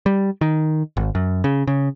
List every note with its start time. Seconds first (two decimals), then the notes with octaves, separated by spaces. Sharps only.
0.06 G3
0.41 D#3
0.97 G#1
1.15 F#2
1.44 C#3
1.67 C#3